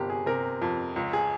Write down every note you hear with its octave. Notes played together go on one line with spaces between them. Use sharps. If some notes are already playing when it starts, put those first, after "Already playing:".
Already playing: G1 C3 G4 A#4
G#4
C3 A#4
F2
C#2
G#4